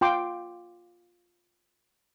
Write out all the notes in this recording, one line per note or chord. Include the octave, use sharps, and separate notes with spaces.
F4 G5 C6 D6